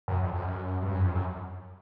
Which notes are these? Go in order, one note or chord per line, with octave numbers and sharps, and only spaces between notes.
F#2
F2
F2
F#2
G2
F#2
F2
F#2